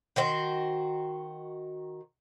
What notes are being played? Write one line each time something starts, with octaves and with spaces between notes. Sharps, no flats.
D#3 F#4 C5